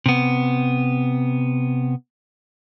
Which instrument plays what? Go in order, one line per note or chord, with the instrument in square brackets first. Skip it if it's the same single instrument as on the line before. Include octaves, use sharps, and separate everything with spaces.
[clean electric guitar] C3 B3